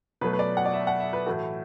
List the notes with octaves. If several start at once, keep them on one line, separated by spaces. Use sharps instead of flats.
B2 F#3 A3 B4
B4
D5
F#5
D5
E5
F#5
E5
B4
A2 E3 A3 F#4